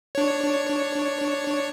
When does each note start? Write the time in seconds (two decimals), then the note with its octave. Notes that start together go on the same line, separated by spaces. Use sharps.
0.15 D4 C#5